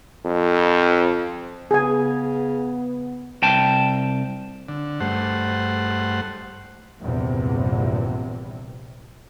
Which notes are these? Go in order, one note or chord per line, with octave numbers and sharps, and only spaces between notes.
F2
C#3 B3 G#4 G#5
C2 G5 A5
D3
G2 A3 C5 F#5
A#1 E2 G2 C3